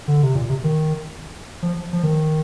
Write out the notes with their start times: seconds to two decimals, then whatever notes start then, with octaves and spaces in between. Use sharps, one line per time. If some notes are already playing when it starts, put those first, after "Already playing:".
0.08 D3
0.23 C3
0.35 A#2
0.50 C3
0.64 D#3
1.63 F3
1.93 F3
2.03 D#3